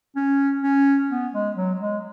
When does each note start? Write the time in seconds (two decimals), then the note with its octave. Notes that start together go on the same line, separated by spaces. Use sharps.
0.16 C#4
0.63 C#4
1.11 B3
1.34 G#3
1.56 F#3
1.81 G#3